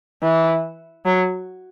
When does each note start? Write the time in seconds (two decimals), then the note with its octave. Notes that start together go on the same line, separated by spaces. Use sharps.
0.23 E3
1.05 F#3